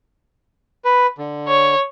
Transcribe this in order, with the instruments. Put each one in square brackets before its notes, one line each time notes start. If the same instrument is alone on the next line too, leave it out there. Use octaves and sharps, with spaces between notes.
[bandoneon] B4
D3
[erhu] C#5